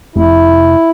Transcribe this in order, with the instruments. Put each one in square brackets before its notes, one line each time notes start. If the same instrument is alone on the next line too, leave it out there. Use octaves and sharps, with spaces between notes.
[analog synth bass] F1 [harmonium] E4